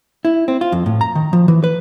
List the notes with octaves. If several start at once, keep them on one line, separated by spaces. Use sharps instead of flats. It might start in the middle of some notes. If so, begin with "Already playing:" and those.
E4
C4
F4
F2
A2
A#5
D#3
F3
E3
B4